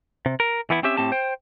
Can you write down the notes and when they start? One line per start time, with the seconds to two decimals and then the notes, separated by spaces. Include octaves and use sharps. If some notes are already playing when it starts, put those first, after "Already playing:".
0.26 C3
0.40 A#4
0.70 E3 B3 E4
0.83 C4 C#4 G4 E5
0.97 A2 C4 G4 A5
1.12 C5 G5